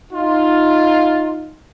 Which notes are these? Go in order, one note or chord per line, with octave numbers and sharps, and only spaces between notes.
D#4 F4